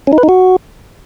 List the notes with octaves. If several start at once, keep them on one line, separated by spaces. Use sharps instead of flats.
C#4
D#4
B4
D#4
F#4